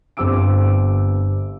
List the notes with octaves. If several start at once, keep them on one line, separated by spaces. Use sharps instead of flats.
G1 C4 D6 E6 D7